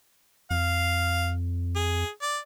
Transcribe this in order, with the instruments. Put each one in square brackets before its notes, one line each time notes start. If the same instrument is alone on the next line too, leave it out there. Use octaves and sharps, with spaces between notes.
[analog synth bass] F2 [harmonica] F5
[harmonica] G#4
D5